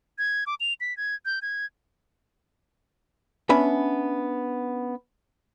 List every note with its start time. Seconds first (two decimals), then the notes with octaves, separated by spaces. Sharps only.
0.18 G#6
0.47 D6
0.60 F7
0.81 B6
0.97 G#6
1.26 G6
1.42 G#6
3.49 B3 C#4 D4 E5 B5